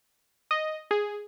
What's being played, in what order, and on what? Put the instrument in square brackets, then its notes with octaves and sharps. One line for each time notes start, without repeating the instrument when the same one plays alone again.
[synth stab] D#5
G#4